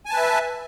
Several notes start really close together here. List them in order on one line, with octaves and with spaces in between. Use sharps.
G#5 A5 B4 E5